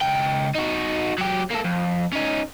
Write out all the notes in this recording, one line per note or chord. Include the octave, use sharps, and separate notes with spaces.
C#2 G5
D#4 F#4
F#3 G4
A#3 A4
F2
C#4 D#4